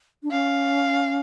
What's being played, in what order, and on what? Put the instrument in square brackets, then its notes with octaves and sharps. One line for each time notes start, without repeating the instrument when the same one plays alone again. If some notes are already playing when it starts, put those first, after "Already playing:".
[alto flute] D4
[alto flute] C#4 [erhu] F5